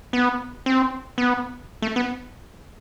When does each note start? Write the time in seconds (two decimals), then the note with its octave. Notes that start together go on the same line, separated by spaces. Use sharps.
0.13 B3
0.66 C4
1.18 B3
1.82 A3
1.96 B3